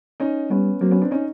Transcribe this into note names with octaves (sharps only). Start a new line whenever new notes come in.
C#4 D#4
G3 B3 C#4
F#3 A#3 C4
B3 C#4
C4 D4
C#4 D#4